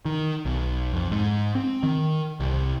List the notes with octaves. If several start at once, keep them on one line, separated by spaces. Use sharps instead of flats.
D#3
B1
F2
G#2
C4
D#3
C2